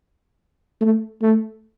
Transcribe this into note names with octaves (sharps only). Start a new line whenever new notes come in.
A3
A3